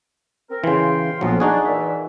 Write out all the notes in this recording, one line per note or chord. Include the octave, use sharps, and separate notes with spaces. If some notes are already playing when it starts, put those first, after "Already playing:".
C4 A#4
C#3 E3 F5 G5 C6
A#1 F2 F#3 B3 F4
D4 D#4 F#4 G#4
A#2 E3 E5